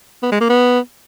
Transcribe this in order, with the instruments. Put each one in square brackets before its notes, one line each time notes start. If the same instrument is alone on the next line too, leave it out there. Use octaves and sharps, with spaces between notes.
[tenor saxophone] B3
G#3
A#3
B3